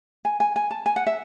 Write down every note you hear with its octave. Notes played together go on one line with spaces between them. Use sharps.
G#5
G#5
G#5
A5
G#5
F#5
E5